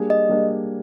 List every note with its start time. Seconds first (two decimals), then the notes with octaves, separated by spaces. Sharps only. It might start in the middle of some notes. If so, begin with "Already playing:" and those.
Already playing: G3 A#3 D4 G#4
0.10 D#5
0.29 G3 A#3 D4 G#4